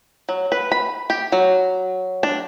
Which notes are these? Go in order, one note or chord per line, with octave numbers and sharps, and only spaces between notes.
F#3
B4
B5
G4
F#3
D4